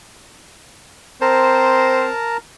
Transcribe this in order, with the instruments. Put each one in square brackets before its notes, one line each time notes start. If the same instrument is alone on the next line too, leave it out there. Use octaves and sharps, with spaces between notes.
[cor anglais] C4 [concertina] A#4 A5 A#5 [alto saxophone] C5